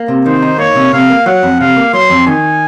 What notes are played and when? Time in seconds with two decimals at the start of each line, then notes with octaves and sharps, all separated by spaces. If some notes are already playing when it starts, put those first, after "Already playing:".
Already playing: A#3
0.08 C3
0.25 D#3 C5
0.42 D#4
0.58 A#3 C#5
0.75 C3
0.93 C3 F5
1.10 A#3
1.26 F#3 F#5
1.43 F2
1.60 C3 F5
1.77 A#3
1.93 F#3 C6
2.10 F2
2.27 D#3 G#5